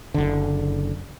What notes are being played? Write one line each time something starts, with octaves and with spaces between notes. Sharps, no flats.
F#1 D3